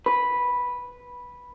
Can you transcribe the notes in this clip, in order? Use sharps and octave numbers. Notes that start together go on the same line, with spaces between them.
B4